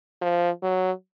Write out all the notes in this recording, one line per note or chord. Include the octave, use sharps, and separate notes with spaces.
F3
F#3